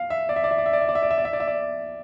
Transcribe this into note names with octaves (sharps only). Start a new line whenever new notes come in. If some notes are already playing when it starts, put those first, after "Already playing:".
Already playing: F5
E5
D5
E5
D5
E5
D5
E5
D5
E5
D5
E5
D5
E5
D5
E5
D5
E5
D5